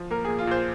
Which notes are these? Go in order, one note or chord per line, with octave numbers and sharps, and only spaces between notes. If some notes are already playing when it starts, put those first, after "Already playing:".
Already playing: F3
A#3 A#4
A#2 G#4
F4
A#2 C5